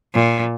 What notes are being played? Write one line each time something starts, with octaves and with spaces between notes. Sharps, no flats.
A#2